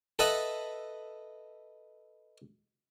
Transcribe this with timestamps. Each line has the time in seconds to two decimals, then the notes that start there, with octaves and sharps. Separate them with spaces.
0.19 A4 B4 D#5 E5 F#5